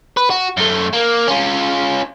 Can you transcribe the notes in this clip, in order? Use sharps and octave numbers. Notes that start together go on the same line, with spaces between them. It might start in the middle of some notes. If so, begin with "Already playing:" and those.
B4
F#4
F#2 A3
A#3
C#4 F4